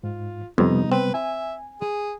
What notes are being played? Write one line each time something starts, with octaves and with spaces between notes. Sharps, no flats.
G#2 F4
F2 C3 G3 B3 D#4
C4 B4
E5 G#5
G#4